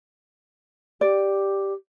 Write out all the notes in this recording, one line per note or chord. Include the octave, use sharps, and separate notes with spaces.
G4 D5